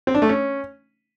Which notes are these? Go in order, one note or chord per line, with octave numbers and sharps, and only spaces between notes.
C4
D4
A3
C#4